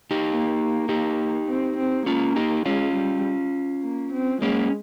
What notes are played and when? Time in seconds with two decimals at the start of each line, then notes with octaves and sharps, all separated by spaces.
0.11 D#4 G4
0.30 A#3
0.89 D#4 G4
1.48 C4
1.77 C4
2.06 A#3 C#4 F4
2.36 D#4 G4
2.66 G#3 C#4 F4
2.95 G3
3.83 A#3
4.12 C4
4.41 G#3 A#3 C#4